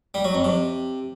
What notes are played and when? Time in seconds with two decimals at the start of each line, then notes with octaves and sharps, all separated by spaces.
0.14 G3
0.24 F#3
0.34 F2
0.44 C3